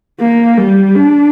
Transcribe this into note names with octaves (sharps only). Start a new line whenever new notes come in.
A#3
G3
D4